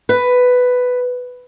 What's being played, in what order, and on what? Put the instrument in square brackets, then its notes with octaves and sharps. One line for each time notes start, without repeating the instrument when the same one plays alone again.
[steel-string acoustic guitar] B4